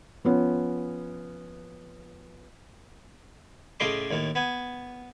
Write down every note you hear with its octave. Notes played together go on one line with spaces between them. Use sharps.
F3 B3 C#4
A2 C#3 A3 D#5 C6 D6
D#2 A2
B3 G#5